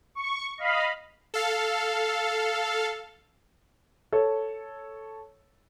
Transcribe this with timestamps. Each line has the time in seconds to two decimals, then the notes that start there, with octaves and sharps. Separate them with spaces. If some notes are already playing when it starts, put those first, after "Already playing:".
0.15 C#6
0.58 D#5 F5 B5
1.34 A4 F5
4.12 A4 C#5